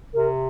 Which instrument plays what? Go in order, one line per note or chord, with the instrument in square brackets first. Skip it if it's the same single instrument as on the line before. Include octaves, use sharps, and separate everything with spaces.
[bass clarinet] C3 [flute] A#4